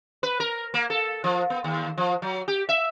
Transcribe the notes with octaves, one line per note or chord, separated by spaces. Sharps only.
B4
A#4
A#3
A4
F3
B3
D#2
F3
F#3
G4
E5